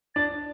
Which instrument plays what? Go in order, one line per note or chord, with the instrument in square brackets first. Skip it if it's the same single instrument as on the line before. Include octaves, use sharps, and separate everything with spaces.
[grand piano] D4 [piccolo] A6